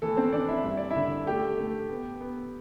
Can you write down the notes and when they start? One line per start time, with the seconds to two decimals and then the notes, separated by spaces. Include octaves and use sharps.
0.02 E3 A3 A4
0.17 C4 C5
0.32 E3 D4 D5
0.48 E4 E5
0.64 G2 E5
0.77 D5
0.91 E4 E5
0.96 D3
1.26 A3 G4 G5
1.58 A3
1.89 B3
2.21 B3